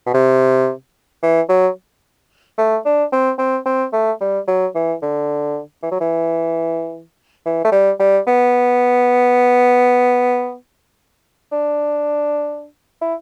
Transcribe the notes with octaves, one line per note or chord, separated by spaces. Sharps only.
B2
C3
E3
F#3
A3
D4
C4
C4
C4
A3
G3
F#3
E3
D3
E3
F#3
E3
E3
A3
G3
G3
B3
D4
E4